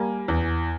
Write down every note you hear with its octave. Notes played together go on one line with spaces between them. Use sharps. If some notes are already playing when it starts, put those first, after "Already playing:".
Already playing: G3 A#3 G#5
E2